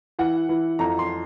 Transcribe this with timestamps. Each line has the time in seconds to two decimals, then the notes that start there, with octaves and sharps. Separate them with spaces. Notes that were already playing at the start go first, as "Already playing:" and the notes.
0.19 E3 F#5
0.49 E3
0.79 F2 A#5
0.99 C6